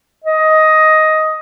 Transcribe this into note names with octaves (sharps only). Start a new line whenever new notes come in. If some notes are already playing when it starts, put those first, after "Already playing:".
D#5